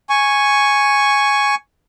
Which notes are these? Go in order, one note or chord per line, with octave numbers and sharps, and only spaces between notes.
G#5 C#6